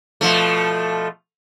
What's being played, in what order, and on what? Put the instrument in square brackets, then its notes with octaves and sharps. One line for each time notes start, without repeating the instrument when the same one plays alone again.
[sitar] B2 F3 A3